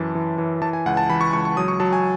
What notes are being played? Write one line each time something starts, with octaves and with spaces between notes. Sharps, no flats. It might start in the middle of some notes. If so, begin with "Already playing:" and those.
Already playing: F#2 E3 A5
E3
E3
E3 A5
G#5
C#2 F#5
A5
E3 B5
C#6
C#2 C#6
C#6
F#3 D#6
C#6
F#3 A5
G#5